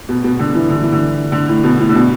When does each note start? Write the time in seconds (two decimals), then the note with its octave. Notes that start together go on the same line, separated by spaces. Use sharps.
0.09 B2
0.24 B2
0.39 D3
0.55 E3
0.70 D3
0.82 E3
0.92 D3
1.32 D3
1.48 A2
1.64 B2
1.79 A2
1.89 D3
1.95 B2